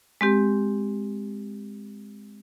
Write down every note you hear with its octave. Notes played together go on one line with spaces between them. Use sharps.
G#3 C4 G4